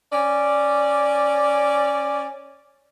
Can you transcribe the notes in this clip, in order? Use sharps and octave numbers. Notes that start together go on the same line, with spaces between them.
C#4 D5